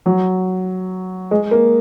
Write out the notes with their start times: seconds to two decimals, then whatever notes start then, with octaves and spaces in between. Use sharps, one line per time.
0.06 F#3
1.31 G#3
1.51 A#3